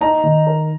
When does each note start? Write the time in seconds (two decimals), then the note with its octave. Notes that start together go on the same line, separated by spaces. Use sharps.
0.01 D#4 A#5
0.23 D#3
0.47 A#4